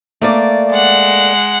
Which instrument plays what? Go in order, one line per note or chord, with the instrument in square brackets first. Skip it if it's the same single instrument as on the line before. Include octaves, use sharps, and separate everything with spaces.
[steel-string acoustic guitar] A3 A#3 D5
[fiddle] G#3 F#5